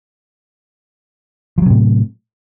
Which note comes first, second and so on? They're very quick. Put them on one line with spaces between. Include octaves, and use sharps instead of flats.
F3 F#3 C3 A2